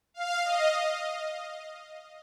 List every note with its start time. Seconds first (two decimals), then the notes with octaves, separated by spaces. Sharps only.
0.14 F5
0.44 D#5